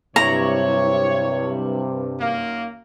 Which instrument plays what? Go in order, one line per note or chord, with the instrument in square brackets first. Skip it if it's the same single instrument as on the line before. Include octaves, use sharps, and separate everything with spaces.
[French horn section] G2 C3 [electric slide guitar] F#3 E4 [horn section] C#5 [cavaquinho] A#5
[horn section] F#2 D#3 A#3